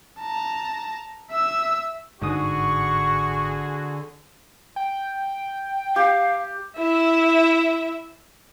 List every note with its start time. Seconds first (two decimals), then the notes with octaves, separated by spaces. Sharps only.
0.20 A5 A#5
1.32 E5 E6
2.22 G1 G#2 D3 F#4 G#4 C#6 D#6
4.76 G5
5.96 G4 F5
6.77 E4 E5